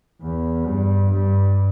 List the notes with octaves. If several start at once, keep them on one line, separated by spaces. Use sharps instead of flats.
E2
G2
G2